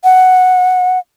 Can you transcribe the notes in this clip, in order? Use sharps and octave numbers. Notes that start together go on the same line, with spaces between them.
F#5